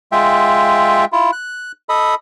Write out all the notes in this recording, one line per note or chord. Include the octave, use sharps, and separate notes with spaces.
G#3 F4 E5 G5
E4 F4
F#6
A4 D#5 B5